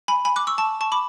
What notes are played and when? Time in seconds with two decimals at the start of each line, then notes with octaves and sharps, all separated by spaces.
0.08 G#5 B5
0.25 G#5 B5
0.36 D6 F#6
0.47 C#6 E6
0.58 A5 C#6
0.81 A5 C#6
0.92 B5 D6